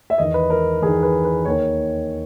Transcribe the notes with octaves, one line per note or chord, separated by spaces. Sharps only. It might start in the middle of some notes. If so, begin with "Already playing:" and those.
E5
E2 D#3 D#5
B4
A#4
E2 D#3 G#4
B4
B4
D#2 D#3 C#5